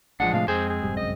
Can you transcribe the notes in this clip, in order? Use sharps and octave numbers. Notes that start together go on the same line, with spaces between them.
A1 F3 G#3 D4 F#5
A2 C3 A3 F5
F2 G#3 C4 G#4 C5
G#4
F1 G#2 G3
G1 C2 F#2 D#5